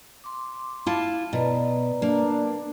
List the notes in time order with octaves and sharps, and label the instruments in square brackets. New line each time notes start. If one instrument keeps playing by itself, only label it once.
[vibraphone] C6 D6
[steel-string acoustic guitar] E4 F4 A5
[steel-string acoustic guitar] B2 [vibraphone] B4 D5 A#5
[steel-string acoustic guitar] A#3 [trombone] D4